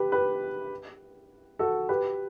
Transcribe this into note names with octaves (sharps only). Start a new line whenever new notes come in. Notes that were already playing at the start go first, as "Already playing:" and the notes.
Already playing: G4 B4
G4 B4
F#4 A4
G4 B4